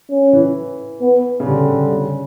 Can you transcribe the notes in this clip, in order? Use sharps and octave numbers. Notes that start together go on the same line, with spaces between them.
C#4
E3
B3
C#3
D3 G3
D3
C#3